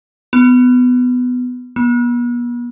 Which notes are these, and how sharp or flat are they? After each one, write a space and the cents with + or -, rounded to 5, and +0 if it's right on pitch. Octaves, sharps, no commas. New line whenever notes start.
B3 +15
B3 -40